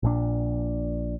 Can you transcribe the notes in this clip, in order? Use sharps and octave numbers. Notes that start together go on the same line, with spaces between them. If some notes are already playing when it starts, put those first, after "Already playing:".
A#1 A#2 D4